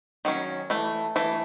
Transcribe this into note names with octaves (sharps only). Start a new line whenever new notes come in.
D#3 F#3 C#4
E3 A3
E3 A3